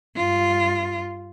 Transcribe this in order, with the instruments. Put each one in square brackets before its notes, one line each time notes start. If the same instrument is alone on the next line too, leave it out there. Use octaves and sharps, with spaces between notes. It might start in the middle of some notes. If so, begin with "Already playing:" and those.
[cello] G2 F4